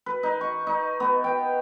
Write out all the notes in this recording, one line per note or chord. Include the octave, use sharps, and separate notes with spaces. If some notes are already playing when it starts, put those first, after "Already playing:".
B4
D#4
C#6
D#4
B3
G5